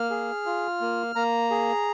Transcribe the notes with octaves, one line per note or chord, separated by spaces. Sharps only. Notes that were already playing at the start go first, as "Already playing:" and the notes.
Already playing: A#3 F6
G#4
F4
A#3
A#3 A#5
G#4